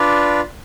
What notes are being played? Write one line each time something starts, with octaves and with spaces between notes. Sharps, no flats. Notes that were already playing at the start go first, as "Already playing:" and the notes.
Already playing: D4 F4 B4 D5